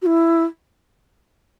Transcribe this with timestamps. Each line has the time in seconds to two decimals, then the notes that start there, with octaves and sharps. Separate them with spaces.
0.02 F#4
0.06 E4